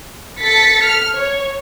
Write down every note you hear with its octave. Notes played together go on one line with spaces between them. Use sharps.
A4 A6 B6 C#7
F6
C#5